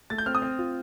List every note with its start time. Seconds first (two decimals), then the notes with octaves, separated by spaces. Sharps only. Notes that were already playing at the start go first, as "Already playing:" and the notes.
0.10 A3 A6
0.18 G6
0.26 C4 F6
0.35 D#6
0.42 C4
0.59 F4